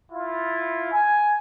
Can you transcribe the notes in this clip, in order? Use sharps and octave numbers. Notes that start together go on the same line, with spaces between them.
E4 F4
G#5